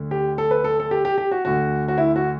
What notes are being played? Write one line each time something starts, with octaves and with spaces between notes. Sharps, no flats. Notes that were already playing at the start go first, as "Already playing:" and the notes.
Already playing: D2 D3
G4
A4
B4
A4
A4
G4
G4
G4
F#4
D2 D3 F#4
F#4
E4
F#4